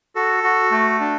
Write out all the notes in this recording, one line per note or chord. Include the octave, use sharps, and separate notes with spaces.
F#4 A4
F#4
A3
D4